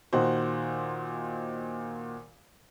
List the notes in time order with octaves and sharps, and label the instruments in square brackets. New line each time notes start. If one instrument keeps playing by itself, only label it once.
[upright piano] A#2 D#3 F#4 C5